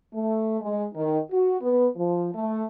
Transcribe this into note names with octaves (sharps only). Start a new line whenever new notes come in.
A3
G#3
D#3
F#4
B3
F3
A3